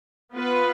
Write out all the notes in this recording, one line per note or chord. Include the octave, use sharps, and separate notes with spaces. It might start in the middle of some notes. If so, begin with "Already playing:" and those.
B3 F4 B4